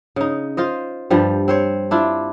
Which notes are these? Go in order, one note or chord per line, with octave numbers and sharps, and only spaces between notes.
C#3 D#4
F4 C5 D#5
G2 F3 G3
C4 C5 C#5
D4 E4 F4